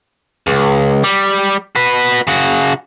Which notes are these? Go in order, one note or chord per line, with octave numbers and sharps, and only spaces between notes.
C#2
G3
F#4 B4
C#3 F#4